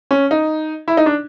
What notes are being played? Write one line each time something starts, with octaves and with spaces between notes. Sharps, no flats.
C#4
D#4
E4
D#4
D4